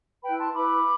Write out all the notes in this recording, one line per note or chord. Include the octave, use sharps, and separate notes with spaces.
E4 B4 G5 B5
A5 C6
E4 B4 B5 D6